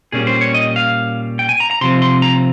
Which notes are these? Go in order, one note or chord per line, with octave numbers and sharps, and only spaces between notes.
A#2 G3 C#4 G#4
C5
C#5
D#5
F5
G5
G#5
A#5
A#5
C3 F3 C4 C6
C6
A#5